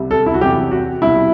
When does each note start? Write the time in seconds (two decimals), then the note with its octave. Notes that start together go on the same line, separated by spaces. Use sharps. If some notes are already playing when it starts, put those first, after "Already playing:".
Already playing: C2 C3 G3
0.11 A4
0.26 E4
0.34 F#4
0.41 E2 C3 F#3 G4
0.71 F#4
1.02 C2 B2 G3 E4